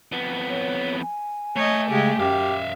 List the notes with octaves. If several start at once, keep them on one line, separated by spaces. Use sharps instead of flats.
F2 B3
C#5
G#5
A3 C#5 D#5
C#3 G#3 G4
F#2 G4 E5 F5